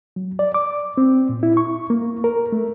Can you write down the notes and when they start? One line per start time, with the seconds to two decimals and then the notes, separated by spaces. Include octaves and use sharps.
0.16 F#3
0.39 D5
0.54 D6
0.98 C4
1.29 A#2
1.43 E4
1.57 C#6
1.90 A#3
2.24 A#4
2.52 A3